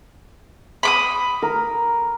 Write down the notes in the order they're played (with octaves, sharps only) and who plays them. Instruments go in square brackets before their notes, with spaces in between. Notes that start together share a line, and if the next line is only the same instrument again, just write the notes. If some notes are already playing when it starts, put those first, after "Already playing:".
[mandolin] B5 D6 D#6
[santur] A#4